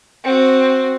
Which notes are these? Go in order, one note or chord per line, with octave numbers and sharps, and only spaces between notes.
C4 F#4